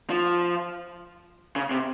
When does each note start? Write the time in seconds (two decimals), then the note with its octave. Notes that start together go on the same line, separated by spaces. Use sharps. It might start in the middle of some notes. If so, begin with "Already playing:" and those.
0.10 F3
1.56 C#3
1.71 C3